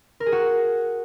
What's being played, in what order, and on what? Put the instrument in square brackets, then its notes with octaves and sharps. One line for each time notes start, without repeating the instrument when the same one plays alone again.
[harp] A#4
G#4
F#4